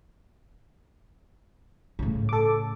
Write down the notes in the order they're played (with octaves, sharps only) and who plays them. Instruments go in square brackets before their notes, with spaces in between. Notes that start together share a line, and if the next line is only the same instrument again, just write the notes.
[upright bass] A2 C#3
[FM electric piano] A4 D6